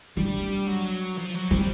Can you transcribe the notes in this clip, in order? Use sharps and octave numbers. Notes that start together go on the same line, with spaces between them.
G3 D4
F#3
F3
F#3
G3 C4